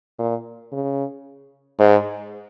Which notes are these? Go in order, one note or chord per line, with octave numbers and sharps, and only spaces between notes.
A#2
C#3
G#2